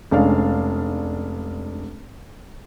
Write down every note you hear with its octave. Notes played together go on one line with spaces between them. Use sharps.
F1 G#3 C#4 D4 F5